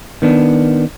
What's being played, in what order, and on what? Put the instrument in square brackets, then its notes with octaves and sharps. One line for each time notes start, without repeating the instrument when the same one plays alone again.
[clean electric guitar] D#3 B3 D4